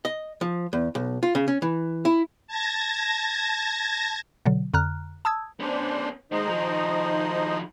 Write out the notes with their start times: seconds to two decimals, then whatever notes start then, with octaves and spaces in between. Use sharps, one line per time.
0.05 D#5
0.41 F3
0.73 E2
0.95 B1
1.23 F4
1.35 C#3
1.48 C#4
1.62 E3
2.05 E4
2.47 A5 G#6 A#6
4.46 B2 D3 F#3
4.74 F2 D3 A#5 F6 F#6
5.25 A5 D#6 E6 G#6
5.60 B3 C#4 D4 C5
6.32 D#2 G#3 D#4 C5 D#5
6.49 D#3 F3